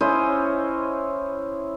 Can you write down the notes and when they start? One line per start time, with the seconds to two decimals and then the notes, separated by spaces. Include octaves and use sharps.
0.01 C#4 E4 C5 D#5